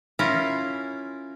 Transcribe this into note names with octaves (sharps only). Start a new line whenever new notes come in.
C#4 E4 F4 A#4